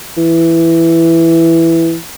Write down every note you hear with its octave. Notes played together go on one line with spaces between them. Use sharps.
E3